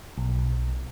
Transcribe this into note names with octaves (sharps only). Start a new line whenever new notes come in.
B1